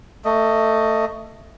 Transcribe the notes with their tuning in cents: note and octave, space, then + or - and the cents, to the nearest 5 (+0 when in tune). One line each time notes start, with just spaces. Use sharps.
A3 +20 D#5 +0